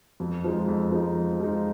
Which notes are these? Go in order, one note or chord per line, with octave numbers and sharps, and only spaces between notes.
F2
F3 G#3 D#4
F2
F3 G#3 D#4
F2
F3 G#3 D#4